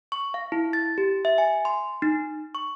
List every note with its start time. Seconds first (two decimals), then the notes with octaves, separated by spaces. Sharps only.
0.12 C#6
0.34 F5
0.52 E4
0.73 A6
0.98 G4
1.25 E5
1.38 G#5
1.65 C6
2.02 D#4
2.55 C#6